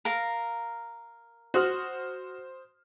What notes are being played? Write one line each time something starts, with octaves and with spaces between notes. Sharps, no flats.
A#4 F5 A#5
F#4 C5 D#6 F6